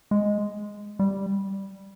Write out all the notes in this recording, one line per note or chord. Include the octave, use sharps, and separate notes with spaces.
G#3
G3